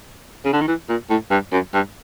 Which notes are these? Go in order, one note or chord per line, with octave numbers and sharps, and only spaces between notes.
C#3
D3
D#3
E3
A#2
A2
G2
F#2
G2